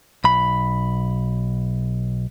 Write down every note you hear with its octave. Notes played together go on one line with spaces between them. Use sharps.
B1 B5